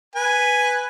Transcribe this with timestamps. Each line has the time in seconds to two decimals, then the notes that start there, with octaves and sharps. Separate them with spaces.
0.15 B4 G#5